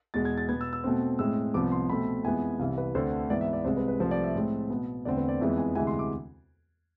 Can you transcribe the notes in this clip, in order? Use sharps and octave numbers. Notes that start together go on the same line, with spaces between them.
E2 B2 G#3 A6
G#6
A6
B2 B3 G#6
E6
E6
B2 A3 C4
A2 G#3 C4 E6
C2 C3 F3 B3 D6
C6
B2 A3 C4 B5
F2 E3 G#3 B3 G#5
C2 C3 E3 F5
B4
D2 D3 A3 C4 C5
G#2 E3 B3 D5
E5
D5
C2 C3 G#3 C5
B4
B4
C2 C3 F3 A3 C5
D5
E5
A2 G#3 C4
B2 B3
E2 D3 A3 C4 D5
B4
D5
F2 E3 G#3 B3
G#5
D2 C3 E3 G#3 G#5
C6
D6